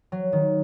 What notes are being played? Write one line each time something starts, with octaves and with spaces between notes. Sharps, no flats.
F#3
D#3